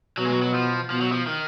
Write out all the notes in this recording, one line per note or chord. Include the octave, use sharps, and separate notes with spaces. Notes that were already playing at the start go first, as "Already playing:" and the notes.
B2 F#3
G#3
F#3
F#3
F3
B2 F3
F#3
F3
D#3